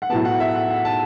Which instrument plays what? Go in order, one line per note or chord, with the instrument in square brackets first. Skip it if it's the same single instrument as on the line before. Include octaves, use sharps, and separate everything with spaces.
[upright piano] F#5
A2 F#3 B3 A5
F#5
E5
F#5
F#5
A5